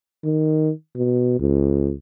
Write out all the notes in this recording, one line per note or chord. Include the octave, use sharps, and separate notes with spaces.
D#3
B2
C#2